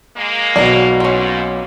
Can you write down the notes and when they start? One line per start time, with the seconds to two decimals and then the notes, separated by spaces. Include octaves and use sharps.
0.17 G#3 A#3
0.56 B1 B2 D5 F5 A#5
1.00 G#2 A#3 C#4 F4